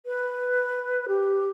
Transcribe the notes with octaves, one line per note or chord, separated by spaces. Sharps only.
B4
G4